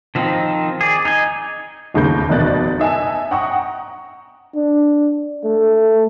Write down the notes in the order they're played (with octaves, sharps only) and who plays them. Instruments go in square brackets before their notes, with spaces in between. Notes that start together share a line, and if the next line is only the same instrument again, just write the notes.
[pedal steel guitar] D#3 F3 C4 D#4
G#4 D5
D#4 D#5 G#5
[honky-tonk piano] G1 D#2 C#3 A#4 G6
F1 B2 A#4 D5 F#6 A6
D#4 E5 G#5 A5
F#5 G5 A#5 C#6 D#6
[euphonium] D4
A3